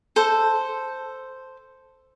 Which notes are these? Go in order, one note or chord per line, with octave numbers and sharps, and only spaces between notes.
A4 C5